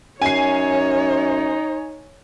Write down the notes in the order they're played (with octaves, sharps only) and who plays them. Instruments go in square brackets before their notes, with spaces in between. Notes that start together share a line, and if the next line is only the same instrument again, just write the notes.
[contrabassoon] F#2 [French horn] D#4 [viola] C#5 [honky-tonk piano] G#5 C7